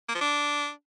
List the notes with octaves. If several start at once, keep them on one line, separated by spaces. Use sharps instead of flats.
A#3
F3
D4